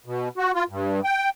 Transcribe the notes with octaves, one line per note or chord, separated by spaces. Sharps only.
B2
F#4
F4
G2
G5